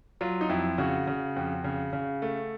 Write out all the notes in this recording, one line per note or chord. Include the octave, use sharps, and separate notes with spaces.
F#3 F4
D#4
F2 E4
C#3 F#4
C#3
F2
C#3
C#3
A3